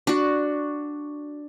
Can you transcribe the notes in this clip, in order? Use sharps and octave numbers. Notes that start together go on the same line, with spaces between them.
D4 F#4